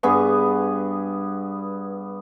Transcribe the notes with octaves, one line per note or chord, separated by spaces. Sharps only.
G2 B3 G#4 C#6